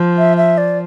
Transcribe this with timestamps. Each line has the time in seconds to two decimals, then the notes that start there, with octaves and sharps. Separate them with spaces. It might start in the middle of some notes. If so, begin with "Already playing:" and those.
Already playing: F3
0.18 E5
0.37 E5
0.58 D5